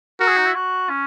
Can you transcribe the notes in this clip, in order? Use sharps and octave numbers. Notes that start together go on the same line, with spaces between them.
F#4 A#4
G#4
D#4
E4
F#4
C#4